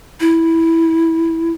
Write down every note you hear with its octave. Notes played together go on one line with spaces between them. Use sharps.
E4